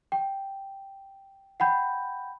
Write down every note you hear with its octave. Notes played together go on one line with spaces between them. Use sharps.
G5
F#5 G5 B5 G6